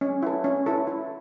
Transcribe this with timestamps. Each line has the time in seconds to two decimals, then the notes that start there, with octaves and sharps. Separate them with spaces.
0.01 C#4
0.22 E4 A4
0.44 C#4
0.66 E4 A4
0.87 E4